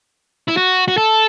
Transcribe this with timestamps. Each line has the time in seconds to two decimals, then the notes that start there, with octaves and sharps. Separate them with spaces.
0.48 E4
0.57 F#4
0.88 F#4
0.98 A4